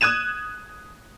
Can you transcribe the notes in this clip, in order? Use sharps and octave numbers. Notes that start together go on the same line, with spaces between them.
D#6 F#6 G#6 D#7 E7